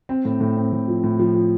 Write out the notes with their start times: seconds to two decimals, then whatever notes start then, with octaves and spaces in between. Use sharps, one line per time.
0.09 C4
0.25 A2
0.40 A2
0.57 C4
0.73 A2
0.88 F3
1.04 A2
1.19 F3
1.35 F3